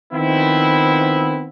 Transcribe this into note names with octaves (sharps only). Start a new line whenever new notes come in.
D#3 F3 B3 C4 E4